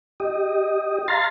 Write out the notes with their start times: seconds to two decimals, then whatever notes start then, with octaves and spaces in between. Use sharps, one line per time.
0.20 G4 D#5
1.08 F5 A#5 C6 A6